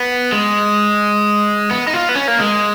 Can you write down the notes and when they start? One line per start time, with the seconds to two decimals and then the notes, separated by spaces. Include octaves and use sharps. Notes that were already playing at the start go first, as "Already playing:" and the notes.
Already playing: B3
0.32 G#3
1.71 B3
1.87 D#4
1.94 F4
2.09 B3
2.16 C#4
2.28 A#3
2.40 G#3